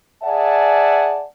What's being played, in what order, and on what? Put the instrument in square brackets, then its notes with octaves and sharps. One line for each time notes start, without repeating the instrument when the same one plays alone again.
[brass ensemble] G#4 D5 E5 F#5 G#5 A5